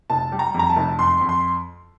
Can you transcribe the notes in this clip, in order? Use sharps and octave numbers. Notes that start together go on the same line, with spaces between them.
F1 A5
G3
A#5
F2 A#5
A5
F1
F2 C6
F2
C6